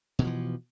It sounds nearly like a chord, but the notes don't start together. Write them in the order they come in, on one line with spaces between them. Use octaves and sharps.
B2 D3 F3 E3